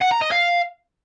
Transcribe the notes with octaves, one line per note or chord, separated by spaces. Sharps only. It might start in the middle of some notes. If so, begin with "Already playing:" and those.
F#5
A#5
D#5
F5